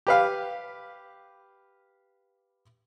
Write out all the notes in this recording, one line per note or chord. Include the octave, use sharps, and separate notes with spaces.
G4 B4 F5